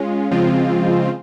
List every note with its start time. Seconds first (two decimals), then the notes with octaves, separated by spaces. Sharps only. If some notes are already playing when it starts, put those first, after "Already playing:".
Already playing: G#3 C#4 F4
0.31 C#3 F3 G#3 C4 F4